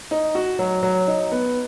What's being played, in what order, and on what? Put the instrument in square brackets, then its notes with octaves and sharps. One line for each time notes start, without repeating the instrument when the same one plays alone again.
[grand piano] D#4
F#4
F#3
F#3
D#4
B3